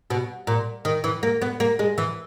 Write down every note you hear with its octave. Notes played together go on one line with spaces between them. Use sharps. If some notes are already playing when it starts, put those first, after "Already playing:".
B2
A#2
D#3
E3
A#3
B3
A#3
G#3
E3